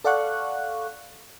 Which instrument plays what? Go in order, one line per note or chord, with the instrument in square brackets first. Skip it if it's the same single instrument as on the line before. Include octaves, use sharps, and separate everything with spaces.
[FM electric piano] A4 D5 F5 F#5 C#6 F#6